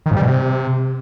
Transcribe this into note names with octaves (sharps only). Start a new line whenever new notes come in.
D#3
G#2
G3
B2
C3